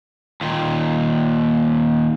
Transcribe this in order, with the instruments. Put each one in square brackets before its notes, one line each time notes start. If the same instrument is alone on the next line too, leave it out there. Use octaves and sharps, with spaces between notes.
[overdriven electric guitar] D#2 A#2